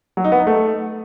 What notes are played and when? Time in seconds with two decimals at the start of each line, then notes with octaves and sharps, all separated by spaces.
0.17 F#3
0.24 D#4
0.32 B3
0.39 D#4
0.47 A3